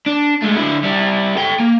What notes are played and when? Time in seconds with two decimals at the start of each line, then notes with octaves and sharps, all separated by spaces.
0.06 D4
0.42 G#3 A3
0.57 D3 E4
0.83 G3 E4
1.37 A4 G5
1.60 A#3